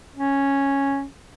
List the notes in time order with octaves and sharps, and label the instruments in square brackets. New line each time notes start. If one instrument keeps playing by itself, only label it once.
[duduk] C#4